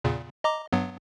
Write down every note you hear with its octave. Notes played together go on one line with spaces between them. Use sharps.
E2 A#2 C#3
D#5 A#5 D6
G2 F#3 B3